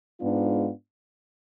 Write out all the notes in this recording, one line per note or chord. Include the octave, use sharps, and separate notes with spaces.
G#2 G#3 B3 D4 F4